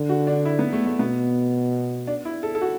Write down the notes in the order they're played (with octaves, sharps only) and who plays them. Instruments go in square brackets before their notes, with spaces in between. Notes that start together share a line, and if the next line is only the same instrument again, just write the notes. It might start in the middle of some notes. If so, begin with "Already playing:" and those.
Already playing: [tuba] D3
[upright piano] F#4
D4
E4
B3
A3
A3
[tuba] B2 [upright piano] B3
[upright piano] D4
E4
A4
A4
F#4